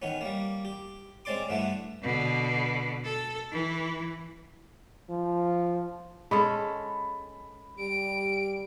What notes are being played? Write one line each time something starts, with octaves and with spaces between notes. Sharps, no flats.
D#3 B3 C#4
G3 A#3
G4
G#3 C4 C#4 D5 C6 D6
G2 D3 A3 B3 E4
B2 D3
A4
E3
F3
G#3 C#4 A4 B5
G3 D7